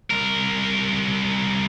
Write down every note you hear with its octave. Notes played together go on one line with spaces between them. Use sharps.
C2 A#4